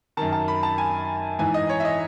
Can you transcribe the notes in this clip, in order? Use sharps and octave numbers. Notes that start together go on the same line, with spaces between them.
F#2 D#3 A5
A5
B5
A5
G#5
G#2 E3 G#5
D#5
C#5
E5
D#5